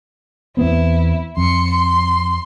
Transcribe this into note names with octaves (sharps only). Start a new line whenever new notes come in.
E2 B3 C4 E4
F2 C6 C#7
C6